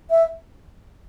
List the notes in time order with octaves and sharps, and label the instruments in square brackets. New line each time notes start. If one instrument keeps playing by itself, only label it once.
[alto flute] E5